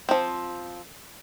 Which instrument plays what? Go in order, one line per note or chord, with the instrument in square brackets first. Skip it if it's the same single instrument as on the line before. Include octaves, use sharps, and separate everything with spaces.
[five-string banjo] F3 C4